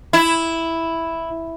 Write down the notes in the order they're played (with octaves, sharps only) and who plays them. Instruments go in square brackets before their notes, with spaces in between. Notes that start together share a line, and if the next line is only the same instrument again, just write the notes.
[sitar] E4